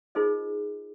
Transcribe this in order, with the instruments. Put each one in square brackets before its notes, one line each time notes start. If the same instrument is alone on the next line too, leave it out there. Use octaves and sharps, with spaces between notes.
[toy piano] D#4 F4 G#4 A#4 C5 D#5